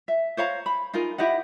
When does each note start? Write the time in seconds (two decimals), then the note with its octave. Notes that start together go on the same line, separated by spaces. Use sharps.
0.08 E5
0.37 C5 C#5 F5 A#5
0.66 B5
0.94 D#4 F4 G#4 A#4
1.18 E4 G4 D#5 F#5